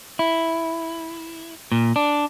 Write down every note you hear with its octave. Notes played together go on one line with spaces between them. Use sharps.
E4
A#2
D4